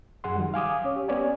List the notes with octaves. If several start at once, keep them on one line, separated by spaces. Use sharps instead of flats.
F#2 G#4 F#5 C6
D#3 F#3 G3
F5 G#5 D6 D#6
C#4 C#5
G4
B3 C#4 C#5 D5 G#5